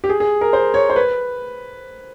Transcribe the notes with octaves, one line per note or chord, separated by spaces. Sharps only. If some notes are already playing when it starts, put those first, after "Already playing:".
G4
G#4
G#4
A#4
C5
C#5
C5
B4